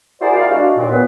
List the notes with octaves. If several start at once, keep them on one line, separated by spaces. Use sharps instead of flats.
E4 F#4 G#4 A#4 C5 D5
D#2 C3 E4 F4 D5 F5
G#3 D4 F#4
D#2 A#2
A#2 F#3 B3 B4